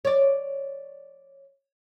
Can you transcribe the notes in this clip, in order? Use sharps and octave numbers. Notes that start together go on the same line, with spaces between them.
C#5 D5